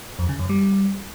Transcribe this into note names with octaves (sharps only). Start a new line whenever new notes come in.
F2
C#3
F#2
G3